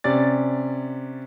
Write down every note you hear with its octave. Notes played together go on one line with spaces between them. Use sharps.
C3 C#4 D5 A6